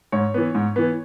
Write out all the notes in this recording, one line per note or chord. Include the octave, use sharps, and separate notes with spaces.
G#2 C#5
E3 B3
G#2
E3 B3